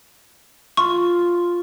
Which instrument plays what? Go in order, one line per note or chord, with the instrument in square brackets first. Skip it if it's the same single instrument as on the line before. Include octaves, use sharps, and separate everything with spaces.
[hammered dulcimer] F4 [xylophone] C#6